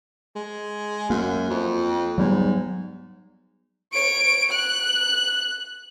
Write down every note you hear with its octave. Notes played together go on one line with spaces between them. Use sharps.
G#3
F#2 A#3
F2
G#2 F#3 G3 B3
C#5 D7
F#6